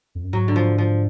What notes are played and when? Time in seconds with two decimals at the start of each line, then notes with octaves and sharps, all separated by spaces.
0.15 F2
0.24 F#2
0.33 G#2 F#3
0.48 D3
0.56 F3
0.78 F3